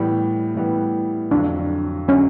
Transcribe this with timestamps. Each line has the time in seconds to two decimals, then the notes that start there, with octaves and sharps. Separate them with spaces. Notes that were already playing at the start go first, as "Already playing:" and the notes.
Already playing: A2 E3 G3 B3
0.55 A2 E3 G3 B3
1.31 F2 D3 F#3 D4
2.08 D3 F#3 C#4